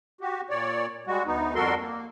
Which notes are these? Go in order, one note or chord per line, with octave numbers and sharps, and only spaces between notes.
F#4 G4
A#2 C#5 D5
G3 G#3 F#4
D2 B3 D#4
F2 G3 F#4 A4 A#4 C6
A#3